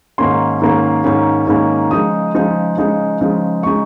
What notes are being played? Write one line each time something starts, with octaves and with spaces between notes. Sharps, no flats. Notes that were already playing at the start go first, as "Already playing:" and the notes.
G#2 D#3 A#3 C#4 C6
G#2 D#3 A#3 C#4
G#2 D#3 A#3 C#4
G#2 D#3 A#3 C#4
C#3 F3 G#3 D#4 D#6
C#3 F3 G#3 D#4
C#3 F3 G#3 D#4
C#3 F3 G#3 D#4
C#3 G#3 D#4 C#6